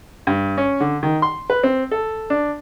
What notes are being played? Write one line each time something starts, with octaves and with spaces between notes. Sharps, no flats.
G2
C#4
D3
D#3
C6
B4
C4
A4
D4